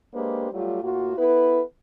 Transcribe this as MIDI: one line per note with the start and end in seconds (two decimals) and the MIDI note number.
0.14 0.48 56
0.14 0.48 58
0.14 0.48 62
0.14 0.48 67
0.14 0.48 71
0.14 0.48 72
0.52 0.82 54
0.52 0.82 55
0.52 0.82 57
0.52 0.82 65
0.52 0.82 67
0.82 1.16 45
0.82 1.16 58
0.82 1.16 65
0.82 1.16 66
1.17 1.62 59
1.17 1.62 64
1.17 1.62 69
1.17 1.62 71